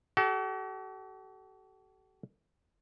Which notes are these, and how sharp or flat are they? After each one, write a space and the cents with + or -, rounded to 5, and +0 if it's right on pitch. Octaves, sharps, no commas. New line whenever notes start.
F#4 +45 A4 -30